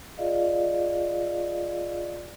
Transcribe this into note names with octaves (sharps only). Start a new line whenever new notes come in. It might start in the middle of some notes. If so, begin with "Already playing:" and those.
F4 G#4 D5 D#5 F5